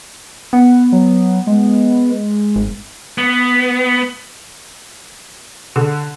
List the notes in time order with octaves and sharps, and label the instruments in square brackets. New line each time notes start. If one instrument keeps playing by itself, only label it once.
[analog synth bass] B3 [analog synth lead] F#5
[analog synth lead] F#3
G#3
[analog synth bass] G#1
[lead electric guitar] B3
[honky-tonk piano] D3